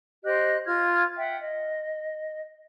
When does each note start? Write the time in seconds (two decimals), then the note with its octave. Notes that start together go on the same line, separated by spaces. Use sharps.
0.24 G4 C5 D#5 F#6
0.66 F4 F6 G#6
1.17 E5 F#5 G5
1.41 D#5